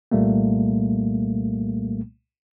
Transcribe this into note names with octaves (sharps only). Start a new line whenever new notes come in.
C2 A#2 G3 A3 A#3